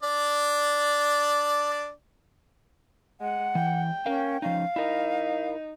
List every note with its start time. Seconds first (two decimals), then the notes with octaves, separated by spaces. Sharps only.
0.03 D4 D5
3.21 G#3 F#5
3.55 E3 G5
4.06 C#4 A#4 F5
4.42 F3 C#4 D#4 F5
4.76 D#4 E4 A#4